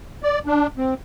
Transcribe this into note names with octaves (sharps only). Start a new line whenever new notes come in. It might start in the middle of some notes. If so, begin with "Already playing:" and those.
D5
D4
C4